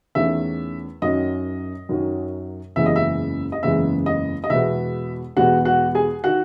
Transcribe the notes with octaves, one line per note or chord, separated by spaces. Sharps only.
E2 D#3 A3 C#4 E5
F#2 D#3 F#3 C#4 D#5
F#2 D#3 F#3 C#4
F#1 E2 C#3 E3 G#3 E5
D#5
E5
D#5
F#1 E2 C#3 E3 G#3 E5
D#5
D#5
E2 B2 G#3 B3 E5
E2 B2 G#3 B3 F#4 F#5
F#4 F#5
G#4 G#5
D#3 F#4 F#5